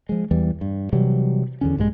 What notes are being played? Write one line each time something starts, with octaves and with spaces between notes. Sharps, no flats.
F3 G#3
E2 E3 G3
G2
C3 E3 F#3 G3
E2 D3 C#4
A#1 G2 C#3 G#3